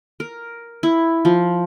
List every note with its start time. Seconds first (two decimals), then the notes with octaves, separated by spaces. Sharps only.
0.20 A#4
0.83 E4
1.25 F3